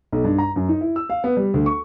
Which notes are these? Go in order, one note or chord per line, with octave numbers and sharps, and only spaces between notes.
B1
G2
A#5
F#2
D#4
E4
E6
F5
B3
G3
D2
C#6